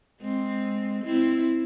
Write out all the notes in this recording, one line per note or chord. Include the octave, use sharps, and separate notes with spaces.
G#3 C4
C4 E4